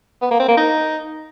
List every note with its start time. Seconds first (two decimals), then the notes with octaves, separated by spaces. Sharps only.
0.22 B3
0.31 A#3
0.40 C4
0.48 A#3
0.57 D#4